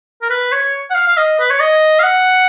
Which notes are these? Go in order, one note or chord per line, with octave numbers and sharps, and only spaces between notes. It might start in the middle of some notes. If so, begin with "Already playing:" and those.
A#4
B4
C#5
F#5
F5
F5
D#5
B4
C#5
D#5
F5
F#5